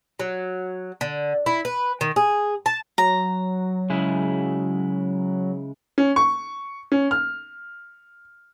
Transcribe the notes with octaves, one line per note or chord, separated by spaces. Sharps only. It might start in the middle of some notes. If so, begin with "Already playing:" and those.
F#3
D3
E4
B4
D#3
G#4
A5
F#3 A#5
C#3 G#3 E4
C#4
C#6
C#4
F6